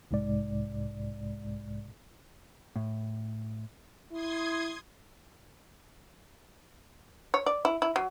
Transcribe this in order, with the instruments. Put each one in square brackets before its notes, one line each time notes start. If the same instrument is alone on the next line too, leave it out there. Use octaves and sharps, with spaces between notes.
[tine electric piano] B1 G#2 C3 G#3 D5
[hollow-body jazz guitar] A2
[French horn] E4 [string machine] C6 D#6 G#6
[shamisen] C#5
D5
E4
E4
F#3